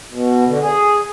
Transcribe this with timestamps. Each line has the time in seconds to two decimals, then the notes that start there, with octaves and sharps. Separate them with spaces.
0.10 B2
0.47 D3
0.61 G#4